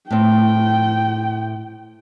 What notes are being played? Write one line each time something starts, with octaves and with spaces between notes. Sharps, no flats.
A2 C4 G5